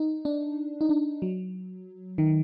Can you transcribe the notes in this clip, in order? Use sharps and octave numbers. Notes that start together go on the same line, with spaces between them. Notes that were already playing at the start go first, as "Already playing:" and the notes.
Already playing: D#4
D4
D#4
D4
F#3
D#3